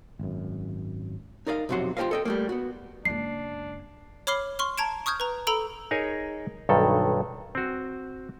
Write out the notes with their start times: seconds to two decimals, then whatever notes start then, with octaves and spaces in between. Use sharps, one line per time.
0.19 G#1 F#2
1.47 D#4 A#4 D5 D#5 F5
1.69 B1 F2 C3 F#3 F#4 C6
1.97 F4 G4 A4 C5 D#5 F5
2.11 A4 D#5 G5
2.25 G3 A3 A#3
2.49 B3 F#4
3.05 F#1 G#3 D4 C7
4.27 C#5 B5 D6 F6 C7 G7
4.59 C6 C#6 F6
4.78 A5 A#5 G#6 D7 E7
5.06 C#6 D#6 F6 G6 G#6
5.20 B4 A#5
5.47 A4 A#5 B5 E6 D7
5.91 D#4 G#4 A#4 C#5 G#5
6.69 B1 G2 D#3 A4
7.55 C4 F#4